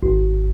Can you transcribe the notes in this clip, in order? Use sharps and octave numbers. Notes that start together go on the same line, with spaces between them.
G#1